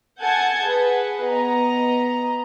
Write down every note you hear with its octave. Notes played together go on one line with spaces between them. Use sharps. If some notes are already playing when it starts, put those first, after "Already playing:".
A4 F#5 G#5 A5 G6 G#6
G#4 B4 F#5
B3 D#5 A#5